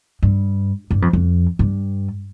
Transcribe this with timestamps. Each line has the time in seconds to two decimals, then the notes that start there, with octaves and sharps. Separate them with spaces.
0.23 G2
0.91 G2
1.02 F2
1.13 F2
1.59 G2